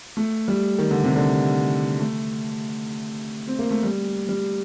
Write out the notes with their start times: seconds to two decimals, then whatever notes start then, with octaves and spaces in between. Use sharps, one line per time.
0.17 A3
0.48 G3
0.79 D#3
0.91 D3
1.04 C3
1.16 D3
1.99 A3
3.48 C4
3.59 A#3
3.71 A3
3.83 G3
4.29 G3